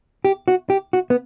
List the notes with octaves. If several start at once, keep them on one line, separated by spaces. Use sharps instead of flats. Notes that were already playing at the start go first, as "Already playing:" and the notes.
G4
F#4
G4
F#4
B3